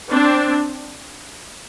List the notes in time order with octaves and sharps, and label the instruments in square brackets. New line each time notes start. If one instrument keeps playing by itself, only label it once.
[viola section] C4 D4